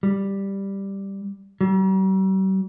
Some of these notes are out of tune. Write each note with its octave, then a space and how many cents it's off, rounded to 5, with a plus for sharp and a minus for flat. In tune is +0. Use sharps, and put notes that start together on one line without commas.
G3 +5
G3 -45